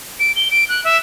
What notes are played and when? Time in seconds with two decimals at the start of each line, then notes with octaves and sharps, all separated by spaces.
0.20 D7
0.36 G7
0.51 D7
0.69 F#6
0.84 E5